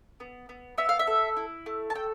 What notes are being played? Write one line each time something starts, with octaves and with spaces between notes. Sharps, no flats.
B3
B3
B3 E5
F5
E5
A4
E4
A3
A5
A4 G5